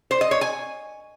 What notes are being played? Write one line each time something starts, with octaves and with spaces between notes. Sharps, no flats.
C5
D#5
C#5
G#5